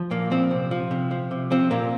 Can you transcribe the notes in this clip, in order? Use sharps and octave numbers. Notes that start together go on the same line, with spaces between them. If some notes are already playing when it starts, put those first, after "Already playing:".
Already playing: F3
A#2 A#3
F3 C4
C3
F3
C3
F3
C3
F3 C4
A#2 A#3